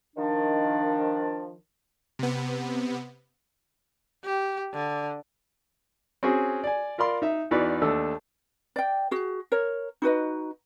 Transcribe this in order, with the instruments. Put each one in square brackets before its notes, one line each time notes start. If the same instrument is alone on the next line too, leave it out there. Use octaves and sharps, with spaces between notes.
[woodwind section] D#3 F3 D4
[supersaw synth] C3 B3
[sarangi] G4
D3
[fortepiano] C4 C#4 F#4 G#4
D5 G#5
F4 A#4 D5 B5 C6
D#4 E5
E2 E3 D#4 F#4 B4 D5
D#2 A3 D4 A4 A5 E6
[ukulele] D5 G5
F#4 G#4
A#4 C#5
D#4 F#4 B4 D#5